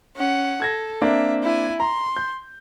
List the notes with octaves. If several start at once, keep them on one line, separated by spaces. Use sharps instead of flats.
C#4 F#5
A4 G#6 A#6
A#3 C4 D4 E5
E4 G#5
A#5 C6
G6